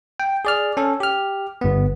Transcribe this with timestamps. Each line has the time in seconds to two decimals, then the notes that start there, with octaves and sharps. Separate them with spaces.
0.20 G5
0.45 G#4 D5 F6
0.77 C#4 A4
1.00 G4 F6
1.61 G1 B3